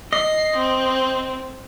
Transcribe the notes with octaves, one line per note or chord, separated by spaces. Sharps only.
D#5 C7
C4